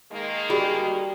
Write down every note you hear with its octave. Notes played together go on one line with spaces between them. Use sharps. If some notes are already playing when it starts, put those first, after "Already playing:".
D#3 G#3 A#3
G3 F#4 G#4 B5